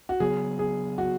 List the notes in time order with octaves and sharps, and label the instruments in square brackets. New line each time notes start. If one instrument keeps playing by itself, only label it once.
[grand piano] F#4
[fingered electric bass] C#3 F#3 B3 [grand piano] G#4
[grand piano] G#4
F#4